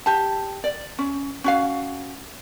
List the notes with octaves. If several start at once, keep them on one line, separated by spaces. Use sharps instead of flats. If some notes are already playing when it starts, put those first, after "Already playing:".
G4 A5
D5
C#4
C#4 F#4 F5